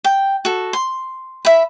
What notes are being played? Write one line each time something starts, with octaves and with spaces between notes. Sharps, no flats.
G5
F#4 A4
C6
E5 B5